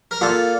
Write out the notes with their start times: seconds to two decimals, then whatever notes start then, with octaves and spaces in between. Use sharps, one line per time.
0.11 A#4
0.21 A#2 F4 A4